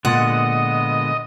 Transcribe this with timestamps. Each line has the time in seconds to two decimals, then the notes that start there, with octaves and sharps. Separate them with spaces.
0.05 A#2 D3 G#3 B3 D#5 F#5 C6 A6